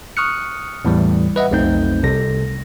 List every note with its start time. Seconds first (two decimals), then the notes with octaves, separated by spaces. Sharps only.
0.17 C#6 D#6 F6 F#6 C#7
0.85 E2 A2 E3 G3
1.36 B4 D#5 E5 F#5
1.51 B1 F2 A3 C4 D#4 G6
2.03 C2 C3 A4 A#6